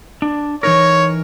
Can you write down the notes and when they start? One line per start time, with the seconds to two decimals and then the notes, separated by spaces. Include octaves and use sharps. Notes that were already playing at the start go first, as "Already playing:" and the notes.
0.22 D4
0.63 E3 D#4 A#4 C#5